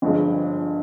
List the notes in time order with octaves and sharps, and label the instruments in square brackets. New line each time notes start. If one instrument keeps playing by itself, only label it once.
[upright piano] G1 G2 F3 G#3